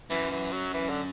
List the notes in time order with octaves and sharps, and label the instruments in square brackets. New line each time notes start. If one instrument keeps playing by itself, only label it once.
[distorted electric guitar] F#2 [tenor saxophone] E3
[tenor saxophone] E3
F#3
E3
D3